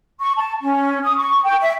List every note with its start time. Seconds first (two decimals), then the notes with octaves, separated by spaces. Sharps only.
0.19 C#6
0.37 A5
0.61 C#4
1.03 D#6
1.16 C#6
1.44 G5
1.60 E5